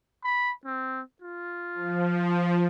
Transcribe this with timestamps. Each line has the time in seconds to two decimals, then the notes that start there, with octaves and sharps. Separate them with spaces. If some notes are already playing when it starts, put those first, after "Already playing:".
0.24 B5
0.66 C4
1.22 F4
1.74 F3